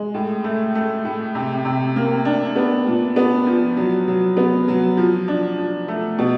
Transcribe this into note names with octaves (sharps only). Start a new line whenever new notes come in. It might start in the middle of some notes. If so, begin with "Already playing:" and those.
Already playing: G#3
A2
A3
A3
A2
C3
C3
A#3
D4
B3
A#2
B3
F3
F#3
F#3
B3
F#3
F3
D4
F3
A3
B2